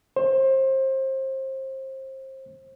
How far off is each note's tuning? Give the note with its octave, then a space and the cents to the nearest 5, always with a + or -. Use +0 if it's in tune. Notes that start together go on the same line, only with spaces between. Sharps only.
C5 +25